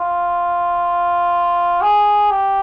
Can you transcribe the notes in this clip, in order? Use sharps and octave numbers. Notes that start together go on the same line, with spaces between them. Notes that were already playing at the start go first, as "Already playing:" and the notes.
Already playing: F4
G#4
G4